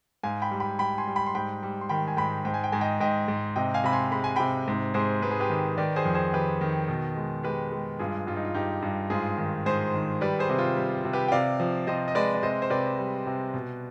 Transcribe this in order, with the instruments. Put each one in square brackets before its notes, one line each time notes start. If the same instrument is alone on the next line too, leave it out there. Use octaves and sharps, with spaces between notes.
[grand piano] G#2 F5 G#5
G5 B5
G3
G5 B5
G3 G5 B5
G#5 C6
G3
G5 B5
C6
G#2 G5 B5
G3
C6
D#3 G5 B5
G#5
G#2 G5 B5
G#2 G5
G#5
G5
G#2 G#5
D#5 G5
G#2 D#5 G5
G#2
C3 D#5 G5
F5 G#5
C3 B5
G#5 C6
G#3 B5
G#5
C3 G5 B5
G#2
G#2 G#4 C5
G#2 B4
G#4
G4 B4
D#3
D#3 B4 D5
G#4 C5
F2
G#4 C5
D#3 G4 B4
D#3
B2
G#3
G#3 G4 B4
G#3
G2 F4 G#4
G2 F4
D#4
F4
G2 D#4 G4
G2
G#2 F4 G#4
D#3
G#2 G#4 C5
D#3
G3 B4 D5
G#4 C5
C3
F4
G3
C3
G4 B4
G5
C3 D5 F5
F3
C3 C5 D#5
D#5
G#3 B4 D5
D5
C3 C5 D#5
C5
C3 B4 D5
G3
C3
B2